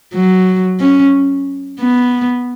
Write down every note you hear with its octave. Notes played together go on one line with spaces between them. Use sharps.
F#3
C#4
B3